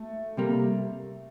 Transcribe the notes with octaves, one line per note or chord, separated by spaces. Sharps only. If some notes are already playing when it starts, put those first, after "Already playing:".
Already playing: A3
C3 G3 A#3